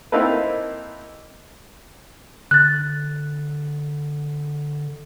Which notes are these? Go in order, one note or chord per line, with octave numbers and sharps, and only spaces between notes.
A#3 C4 D#4 E4 A4 B4
D3 F#6 A6